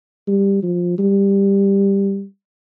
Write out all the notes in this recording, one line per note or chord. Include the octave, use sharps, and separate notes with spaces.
G3
F3
G3